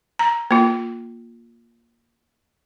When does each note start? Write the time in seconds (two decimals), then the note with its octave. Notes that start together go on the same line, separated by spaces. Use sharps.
0.19 A#5
0.51 A#3 F4